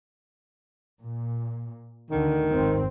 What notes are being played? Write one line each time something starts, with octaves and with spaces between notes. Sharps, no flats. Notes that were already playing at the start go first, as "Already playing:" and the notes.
A#2
D2 D3 D#3
G#1 F2 C4